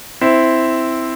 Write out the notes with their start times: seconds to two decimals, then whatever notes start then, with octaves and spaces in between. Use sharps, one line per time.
0.21 C4 E4